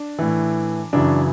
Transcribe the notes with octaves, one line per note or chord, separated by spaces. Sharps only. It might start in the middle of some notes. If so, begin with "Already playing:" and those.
Already playing: D4
A2 E3
F#2 C#3 E3 D4